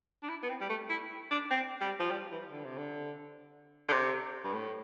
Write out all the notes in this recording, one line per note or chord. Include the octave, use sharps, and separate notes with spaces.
D4
E4
B3
C4
G3
A3
E4
D4
C4
G3
F3
G3
E3
D3
C3
D3
D3
C3
G2
A2